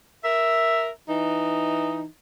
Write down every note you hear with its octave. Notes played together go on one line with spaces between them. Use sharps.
A#4 E5
E3 D#4